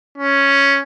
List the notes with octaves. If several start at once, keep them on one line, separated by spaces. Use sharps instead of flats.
C#4